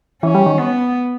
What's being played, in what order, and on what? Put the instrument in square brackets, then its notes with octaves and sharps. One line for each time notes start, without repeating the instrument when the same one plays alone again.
[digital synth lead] E3 [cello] C#4
[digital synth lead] G3
D#3
[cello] B3